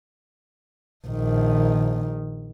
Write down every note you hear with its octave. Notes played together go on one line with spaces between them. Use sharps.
A#1 D#3